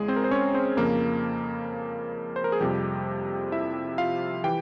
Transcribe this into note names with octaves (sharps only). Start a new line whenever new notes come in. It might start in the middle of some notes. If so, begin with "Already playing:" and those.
Already playing: E2 C#3 G#3 G#4
C4 C5
A#4
C5
C#4 C#5
C4 C5
F2 C#3 F3 A#3 A#4
C5
A#4
G#4
F2 C3 F3 G3 G4
E4 E5
F4 F5
E3 G4 G5